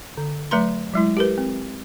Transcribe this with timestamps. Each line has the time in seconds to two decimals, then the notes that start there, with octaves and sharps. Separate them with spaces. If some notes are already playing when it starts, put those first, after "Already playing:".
0.17 D3
0.51 F#3 A3 B4 A#5 C6
0.93 F#3 G#3 E4
1.17 G4 A#4 B4
1.38 C4